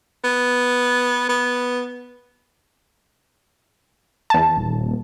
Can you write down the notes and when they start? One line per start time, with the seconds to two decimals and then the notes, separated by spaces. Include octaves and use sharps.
0.24 B3
1.29 B3
4.30 E2 A5
4.57 D#1